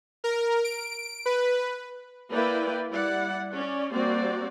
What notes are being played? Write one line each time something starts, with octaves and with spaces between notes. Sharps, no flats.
A#4
D7
B4
A#3 E4 B4 D5 G5
G3 E4 D5 F#5
C#4 D5
G3 A#3 C4 F#4 D5